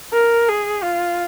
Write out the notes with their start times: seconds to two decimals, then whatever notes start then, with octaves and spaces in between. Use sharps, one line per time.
0.13 A#4
0.48 G#4
0.83 F4